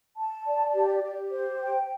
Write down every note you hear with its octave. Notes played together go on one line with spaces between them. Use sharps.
A5
D5
G4
G4
C5
G5